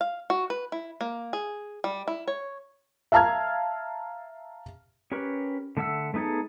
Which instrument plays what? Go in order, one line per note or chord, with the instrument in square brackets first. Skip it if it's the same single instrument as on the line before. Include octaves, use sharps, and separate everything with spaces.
[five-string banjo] F5
F#4
B4
E4
A#3
G#4
G3
E4
C#5
[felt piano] E5 F5 A5 A#5 F6 G#6
[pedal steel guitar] C#4 G4 A#4 B4 C#6
D3 A3 E5 F#5 E6
A3 B3 D#4 G#4 A4